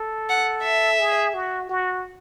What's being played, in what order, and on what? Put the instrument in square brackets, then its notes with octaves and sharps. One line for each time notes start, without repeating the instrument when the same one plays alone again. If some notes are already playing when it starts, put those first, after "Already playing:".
Already playing: [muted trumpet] A4
[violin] F#5
E5
[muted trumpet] G#4
F#4
F#4